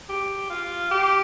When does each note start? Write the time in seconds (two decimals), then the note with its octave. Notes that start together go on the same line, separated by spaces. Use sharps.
0.09 G4
0.50 F4
0.91 G4